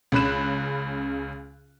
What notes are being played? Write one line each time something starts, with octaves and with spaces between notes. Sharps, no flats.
C#2 C#3 B5 F#6 E7